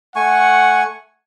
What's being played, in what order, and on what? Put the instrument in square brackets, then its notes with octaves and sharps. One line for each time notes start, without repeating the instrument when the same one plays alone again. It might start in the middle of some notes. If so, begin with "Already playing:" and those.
[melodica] A3 G#5 C#6 [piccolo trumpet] F#5